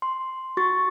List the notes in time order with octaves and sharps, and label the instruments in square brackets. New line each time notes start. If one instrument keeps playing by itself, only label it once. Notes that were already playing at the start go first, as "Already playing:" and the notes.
[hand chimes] C6
F#4 C#6 A6